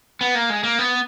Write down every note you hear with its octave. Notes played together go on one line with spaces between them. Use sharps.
B3
A#3
G#3
A#3
B3